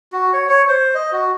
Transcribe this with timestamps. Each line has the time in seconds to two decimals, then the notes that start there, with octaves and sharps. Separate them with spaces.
0.12 F#4
0.33 C#5
0.49 C#5
0.68 C5
0.95 D#5
1.12 F#4